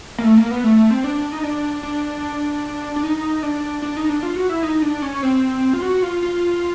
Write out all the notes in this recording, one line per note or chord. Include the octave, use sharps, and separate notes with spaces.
A#3
A3
A#3
B3
A3
A3
C4
D4
D#4
D4
D4
D4
D#4
D4
D4
D#4
D4
F4
F#4
E4
D#4
D4
C#4
C4
F4
F#4
F4
F4